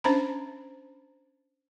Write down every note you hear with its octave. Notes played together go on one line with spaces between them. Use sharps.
C#4 D4 C5 A#5 B5